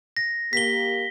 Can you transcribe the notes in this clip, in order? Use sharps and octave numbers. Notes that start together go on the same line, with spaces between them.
A#6
A#3 G4 B6 G7